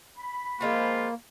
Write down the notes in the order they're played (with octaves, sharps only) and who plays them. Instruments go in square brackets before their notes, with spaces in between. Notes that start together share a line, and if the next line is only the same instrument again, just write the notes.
[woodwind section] B5
[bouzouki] F3 G#3 C4 [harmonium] A#3 [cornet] F4